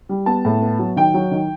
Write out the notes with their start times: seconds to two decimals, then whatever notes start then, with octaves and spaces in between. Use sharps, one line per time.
0.09 G3
0.26 B3 A5
0.45 A2
0.62 B3
0.79 F#3
0.96 D#3 G5
1.14 F#3
1.31 D#3